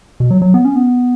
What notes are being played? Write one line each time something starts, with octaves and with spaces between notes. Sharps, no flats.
B2
F#3
F#3
B3
C#4
B3